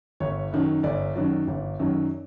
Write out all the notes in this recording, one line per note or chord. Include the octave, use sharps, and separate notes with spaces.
G1 C#5
F#2 D#3 F#3
G1 D5
F#2 D#3 F#3
G1
F#2 D#3 F#3